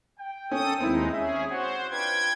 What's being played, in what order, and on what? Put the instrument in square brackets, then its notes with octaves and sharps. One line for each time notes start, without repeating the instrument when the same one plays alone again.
[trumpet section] G5
[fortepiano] C#4 [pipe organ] A4 D#6
[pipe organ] D#2 G#3 D#4 [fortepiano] C4 E4
[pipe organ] C#4 G#4 [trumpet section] E5
[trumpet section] F#4 C#5 F#5 [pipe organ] C5
[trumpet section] D4 F4 B4 [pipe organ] G5 G#6